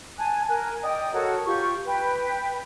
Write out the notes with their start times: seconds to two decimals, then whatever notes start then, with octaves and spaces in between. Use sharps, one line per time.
0.19 G#5 A5 F#6
0.48 A#4 G#5 F#6
0.83 D5 D#5 G5 D#6
1.13 F#4 A4 A#4 C#5
1.45 F4 G4 C#6
1.86 B4 G5